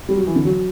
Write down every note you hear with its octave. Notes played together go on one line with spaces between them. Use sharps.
G3
F#3
E3
D3
F#3